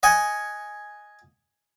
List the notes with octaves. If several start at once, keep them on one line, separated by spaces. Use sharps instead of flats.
D#5 F#5 G#5